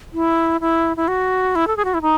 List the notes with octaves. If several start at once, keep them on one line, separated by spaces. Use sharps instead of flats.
E4
E4
E4
F#4
E4
A4
G#4
F#4
E4
D#4